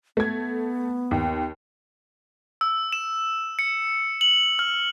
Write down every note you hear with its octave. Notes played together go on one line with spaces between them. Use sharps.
A3 B3 G#6
D#2
E6
E7
C#7
F#7
F6